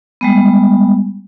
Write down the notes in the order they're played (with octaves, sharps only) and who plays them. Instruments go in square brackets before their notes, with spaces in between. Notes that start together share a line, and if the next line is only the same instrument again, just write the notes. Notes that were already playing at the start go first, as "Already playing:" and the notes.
[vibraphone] G3 G#3 B3